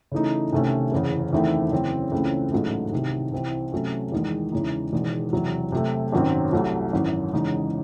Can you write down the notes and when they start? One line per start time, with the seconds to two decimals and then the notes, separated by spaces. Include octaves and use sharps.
0.12 C#3 E3 A3 D#4
0.53 C2 C3 D#3 A3 C#4
0.92 F#1 E2 C#3
1.33 E2 D#3 A3 C4 E4
1.72 F#2 C#3 E3 C4
2.12 C#2 C#3 E3 A3 C4
2.52 A1 G#2 F#3 A3
2.92 C2 C3 D#3
3.32 C2 C3 E3 C4
3.72 C3 F#3 A3 C#4
4.12 E2 D#3 G#3
4.52 E2 C#3 E3 G#3 D#4
4.93 E1 E2 D#3 G#3
5.33 E2 C3 F#3
5.72 C3 F#3 A3
6.12 G#1 F#2 D#3 F#3 C4
6.52 C2 C3 F#3 A3
6.93 G#1 F#2 E3
7.33 E2 C#3 G#3 D#4